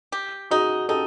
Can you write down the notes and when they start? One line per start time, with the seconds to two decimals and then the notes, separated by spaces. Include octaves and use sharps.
0.12 G4
0.51 D#4 F#4 G#4
0.88 D#4 G4 A4